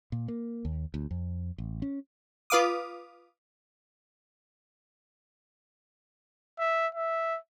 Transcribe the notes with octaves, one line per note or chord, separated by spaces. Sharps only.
A#2
A#3
D#2
D2
F2
A1
C#4
F4 B4 F5 D6 D#6
E5
E5